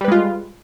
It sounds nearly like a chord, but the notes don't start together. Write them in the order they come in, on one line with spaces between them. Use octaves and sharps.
G3 B4 G#3 F4